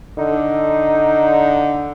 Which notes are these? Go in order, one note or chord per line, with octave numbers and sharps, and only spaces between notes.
D3 D#4